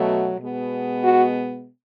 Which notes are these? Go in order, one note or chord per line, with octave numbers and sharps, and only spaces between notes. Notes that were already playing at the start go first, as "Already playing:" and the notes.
Already playing: B2 F#3 A3
B2 G#3 B3
F#4